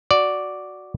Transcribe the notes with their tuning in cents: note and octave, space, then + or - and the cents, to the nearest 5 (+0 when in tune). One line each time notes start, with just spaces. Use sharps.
F#4 +0 D5 +0